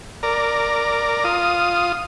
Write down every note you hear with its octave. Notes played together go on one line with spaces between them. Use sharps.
A#4 D5
F4 D#6